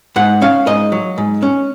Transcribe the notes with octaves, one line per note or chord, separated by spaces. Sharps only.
G#2 F#5
C#4 F5
G#2 D#5
F#3
G#2
C#4